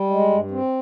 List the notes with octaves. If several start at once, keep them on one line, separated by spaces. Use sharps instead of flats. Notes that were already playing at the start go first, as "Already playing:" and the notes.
Already playing: G3
G#3
G2
C4